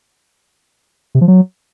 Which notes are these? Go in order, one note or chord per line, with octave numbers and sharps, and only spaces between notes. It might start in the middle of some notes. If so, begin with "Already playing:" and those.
C3
F3
F#3